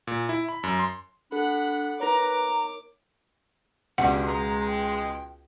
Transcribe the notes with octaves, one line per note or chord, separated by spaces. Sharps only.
A#2
E4
B5
F#2
C6
D4 A4 F#5 B5
D#4 A#4 B4 C#5 A#5 D6
C#2 G2 B2 F#5
G#3 A#5
G5